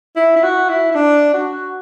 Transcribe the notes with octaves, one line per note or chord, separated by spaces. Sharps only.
E4
E4
F#4
E4
E4
D4
F#4